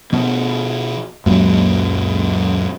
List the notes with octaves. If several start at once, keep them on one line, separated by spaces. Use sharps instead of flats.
B2 F3
C#2 F#2 A#2 F#3